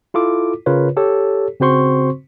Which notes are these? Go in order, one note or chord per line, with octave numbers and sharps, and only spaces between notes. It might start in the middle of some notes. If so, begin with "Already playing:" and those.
E4 F4 A4 D6
C#3 F4 A#4 B4 C#5
G4 A4 C#5
C#3 C4 F#4 C5 C6 C#6